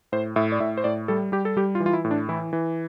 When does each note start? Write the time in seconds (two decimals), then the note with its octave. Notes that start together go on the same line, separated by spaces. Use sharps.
0.12 A2 C5
0.36 A2 E5
0.52 D5
0.60 A2 E5
0.77 C5
0.84 A2 D5
1.08 G3 A4
1.32 G3 G4
1.45 A4
1.57 G3 G4
1.75 F4
1.80 E3
1.86 F4
1.93 E4
2.05 A2
2.11 D4
2.29 E3 E4
2.53 E3